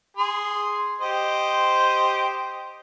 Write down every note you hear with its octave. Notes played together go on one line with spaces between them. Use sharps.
G#4 C6
G4 C5 D#5